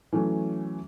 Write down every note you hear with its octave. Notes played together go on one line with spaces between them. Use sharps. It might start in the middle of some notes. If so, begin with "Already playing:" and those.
E3 F#3 A3 C#4